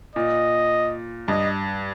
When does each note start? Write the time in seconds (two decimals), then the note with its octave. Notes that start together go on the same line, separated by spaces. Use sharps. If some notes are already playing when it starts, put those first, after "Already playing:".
0.15 A#2 D#5
1.28 G2 D#5